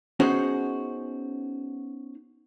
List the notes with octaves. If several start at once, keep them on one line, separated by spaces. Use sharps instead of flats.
B3 C#4 D#4 F#4 G#4 C5